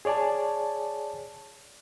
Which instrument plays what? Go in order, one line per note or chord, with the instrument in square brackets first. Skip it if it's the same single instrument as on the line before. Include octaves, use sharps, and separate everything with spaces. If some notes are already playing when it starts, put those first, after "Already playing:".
[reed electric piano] G#4 C#5 D5 G#5 A5